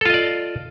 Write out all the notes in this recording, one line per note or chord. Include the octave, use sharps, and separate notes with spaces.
F4 A4 D5 D#5